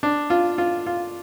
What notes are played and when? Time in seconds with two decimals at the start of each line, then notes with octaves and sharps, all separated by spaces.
0.03 D4
0.30 F4
0.58 F4
0.87 F4